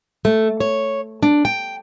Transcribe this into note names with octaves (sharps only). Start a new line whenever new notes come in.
A3
C#5
D4
G5